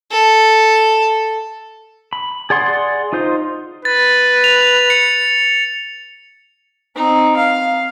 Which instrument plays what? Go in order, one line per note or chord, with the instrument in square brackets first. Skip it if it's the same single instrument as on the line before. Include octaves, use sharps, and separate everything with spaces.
[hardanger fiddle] A4
[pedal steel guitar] B5
G#4 D5 F#5 C6
D#4 F4 C5
[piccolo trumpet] B4 [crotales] A6
[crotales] F7
C#7
[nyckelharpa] C4 D#4
F5